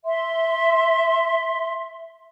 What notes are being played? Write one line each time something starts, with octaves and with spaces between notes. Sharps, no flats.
E5 C6